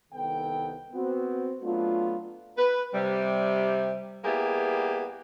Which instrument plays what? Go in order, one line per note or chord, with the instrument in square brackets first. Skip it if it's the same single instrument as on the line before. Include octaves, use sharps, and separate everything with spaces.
[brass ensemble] C2 D#3 B3 A4 G5
B3 C4 F#4
F#3 A3 B3 D4 F4
[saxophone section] B4
C3 G3
G3 A#3 B3 E4 G4 G#4